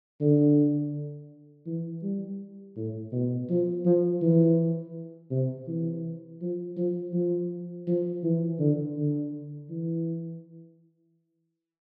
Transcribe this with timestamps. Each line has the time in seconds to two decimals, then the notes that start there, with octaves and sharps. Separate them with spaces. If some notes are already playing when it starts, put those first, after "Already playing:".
0.21 D3
1.66 E3
2.03 G3
2.76 A2
3.12 B2
3.49 F3
3.85 F3
4.22 E3
5.31 C3
5.68 E3
6.41 F3
6.77 F3
7.13 F3
7.87 F3
8.23 E3
8.59 D3
8.96 D3
9.70 E3